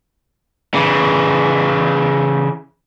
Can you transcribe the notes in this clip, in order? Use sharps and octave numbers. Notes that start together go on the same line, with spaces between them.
C#3 E3